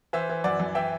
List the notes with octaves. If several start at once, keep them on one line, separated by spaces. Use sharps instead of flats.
E3 C5 E5
E3
F#2 D5 F#5
F#2
E3 E5 G5